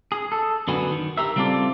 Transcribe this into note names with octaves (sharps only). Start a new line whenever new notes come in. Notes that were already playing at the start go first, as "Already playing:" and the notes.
G#4
A4
F#2 D3 B3 F#4 G#5
D#3
G4 A#4 E5
C#3 G3 C4 F4 A4 D5